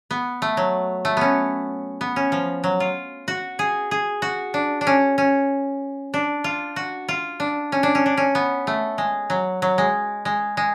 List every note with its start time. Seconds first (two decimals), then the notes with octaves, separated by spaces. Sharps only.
0.11 B3
0.42 A3
0.57 F#3
1.05 A3
1.17 B3 C#4
2.01 B3
2.16 C#4
2.32 F3
2.64 F#3
2.80 F4
3.28 F#4
3.59 G#4
3.91 G#4
4.22 F#4
4.54 D4
4.81 D4
4.87 C#4
5.18 C#4
6.14 D4
6.44 F4
6.76 F#4
7.08 F4
7.40 D4
7.72 C#4
7.83 D4
7.95 C#4
8.06 D4
8.17 C#4
8.35 B3
8.67 A3
8.98 G#3
9.30 F#3
9.62 F#3
9.78 G#3
10.25 G#3
10.57 G#3